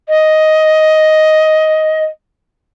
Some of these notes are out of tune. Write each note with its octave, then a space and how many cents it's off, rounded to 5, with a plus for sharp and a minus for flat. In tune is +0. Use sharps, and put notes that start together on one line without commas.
D#5 +10